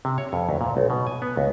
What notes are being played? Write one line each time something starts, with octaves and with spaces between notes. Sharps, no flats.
C3
C#5
F2
D2
A#2
B1
B2
G#5
B3
C#2